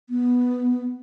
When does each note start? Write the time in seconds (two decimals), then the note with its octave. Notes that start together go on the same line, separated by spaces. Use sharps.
0.10 B3